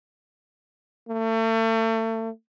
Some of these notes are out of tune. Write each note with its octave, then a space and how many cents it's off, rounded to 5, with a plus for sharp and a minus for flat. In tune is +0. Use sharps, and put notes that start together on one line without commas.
A3 +35